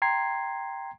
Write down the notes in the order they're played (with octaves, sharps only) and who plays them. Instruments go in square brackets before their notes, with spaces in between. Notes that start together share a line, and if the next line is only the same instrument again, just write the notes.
[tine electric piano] G5 A#5 C6 G#6 C7